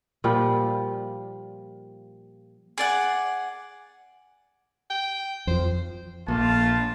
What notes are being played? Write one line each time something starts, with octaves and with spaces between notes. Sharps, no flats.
A#2 F3 G3 F4
G#4 D5 F#5
G5
F2 F3 C5
A#1 A3 A#3 F4 A5